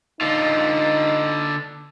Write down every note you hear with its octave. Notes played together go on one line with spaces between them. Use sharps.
D3 D#4 F4